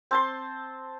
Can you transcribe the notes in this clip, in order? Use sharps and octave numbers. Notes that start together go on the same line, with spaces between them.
C4 A5 C6